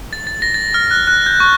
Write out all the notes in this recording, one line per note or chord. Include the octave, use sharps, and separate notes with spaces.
A6
A6
A#6
A6
F6
F#6
F#6
G6
C#6